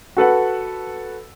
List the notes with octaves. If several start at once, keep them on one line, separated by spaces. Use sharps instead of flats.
F#4 A4 B4 F#5